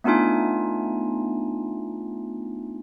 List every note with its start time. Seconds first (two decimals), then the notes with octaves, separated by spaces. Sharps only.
0.04 A3 B3 D4 D#4 F4 G#5